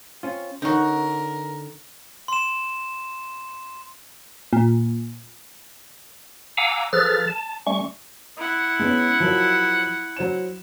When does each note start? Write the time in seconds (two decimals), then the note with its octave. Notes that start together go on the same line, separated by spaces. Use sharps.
0.23 C4 C#4 F4
0.62 D3 C#4 D#4 F#4 A#4
2.28 C6 E7
4.53 A#2
6.57 F5 F#5 G#5 A#5 D6 E6
6.93 F3 G#4 A4 B4 F6 A6
7.28 A5
7.67 G3 A3 C#4 C#6
8.37 E4 F#5
8.79 G#3 B3 C#4
9.20 F3 F#3 A#4
10.17 F#3 C5 E7